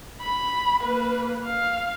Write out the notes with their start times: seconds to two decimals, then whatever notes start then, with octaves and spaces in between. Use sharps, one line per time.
0.21 B5
0.84 A#3 B4
1.46 F5